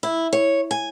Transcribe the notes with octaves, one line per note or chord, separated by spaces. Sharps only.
E4
C#5
G#5